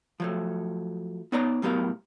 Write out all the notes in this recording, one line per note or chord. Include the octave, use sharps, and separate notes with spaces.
F3 F#3 A3
B3 D#4 B4 C#5 D5 A#5
A2 F#3 B3 G4 A#4 F5